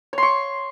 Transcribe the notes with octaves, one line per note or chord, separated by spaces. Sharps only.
C#5 C6 C#6